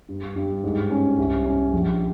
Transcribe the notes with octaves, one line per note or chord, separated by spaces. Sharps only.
G2
G2
G#2
C#4
C2
C#4
A#1